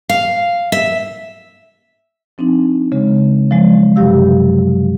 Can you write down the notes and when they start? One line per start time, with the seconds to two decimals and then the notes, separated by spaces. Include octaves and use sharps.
0.09 F5
0.72 E5
2.38 F3 C4 D4 D#4
2.92 C#3 G#3
3.51 F3 F#3 G#3
3.96 F#2 C3 F#3 G4 F5 E6